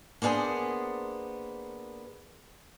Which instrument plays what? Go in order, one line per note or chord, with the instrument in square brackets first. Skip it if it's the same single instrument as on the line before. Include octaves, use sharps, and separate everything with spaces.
[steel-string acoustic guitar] A#3 B3 D4 G#4 C5